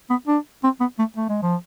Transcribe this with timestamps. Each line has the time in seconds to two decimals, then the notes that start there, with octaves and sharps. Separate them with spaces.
0.10 B3
0.28 D4
0.64 C4
0.81 B3
0.99 A3
1.17 A3
1.30 G#3
1.43 F3